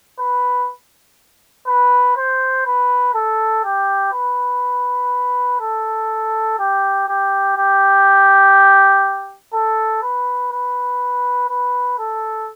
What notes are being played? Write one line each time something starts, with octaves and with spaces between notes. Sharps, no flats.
B4
B4
C5
B4
A4
G4
B4
A4
G4
G4
G4
A4
B4
B4
B4
A4